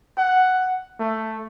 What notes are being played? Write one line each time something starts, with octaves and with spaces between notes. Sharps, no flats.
F#5
A3